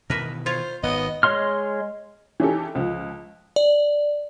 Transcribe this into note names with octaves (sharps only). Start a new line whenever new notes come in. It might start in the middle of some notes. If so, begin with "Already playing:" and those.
B2 D#3 E3 A#4 B4 E5
F4 C5 C#5 F5
G#1 G#2 D#3 B3 D#5
G#3 C#5 D#5 C6 F6
E3 C#4 D#4 G4 A4
C#2 F3
D5